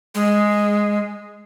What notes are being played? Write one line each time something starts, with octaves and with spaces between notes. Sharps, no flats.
G#3